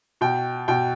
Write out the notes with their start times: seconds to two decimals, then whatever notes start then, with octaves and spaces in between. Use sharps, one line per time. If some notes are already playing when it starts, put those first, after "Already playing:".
0.21 B2 G5
0.68 B2 G5